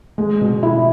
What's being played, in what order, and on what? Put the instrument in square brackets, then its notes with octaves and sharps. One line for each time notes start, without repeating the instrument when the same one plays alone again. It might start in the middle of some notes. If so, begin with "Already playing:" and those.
[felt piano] G#3
B2
E4